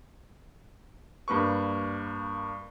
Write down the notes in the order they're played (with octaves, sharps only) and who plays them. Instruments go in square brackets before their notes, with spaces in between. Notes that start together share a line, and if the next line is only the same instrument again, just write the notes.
[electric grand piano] G2 A#3 B4 C#6